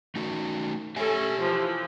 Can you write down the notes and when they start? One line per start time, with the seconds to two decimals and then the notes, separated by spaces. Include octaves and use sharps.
0.16 A3 D#4 F#4
0.96 C#4 G4 A4 E5 G#5
1.40 E3 F3